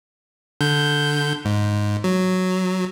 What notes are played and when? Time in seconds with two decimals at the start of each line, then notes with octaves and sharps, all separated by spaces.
0.61 D3 G6
1.45 G#2
2.04 F#3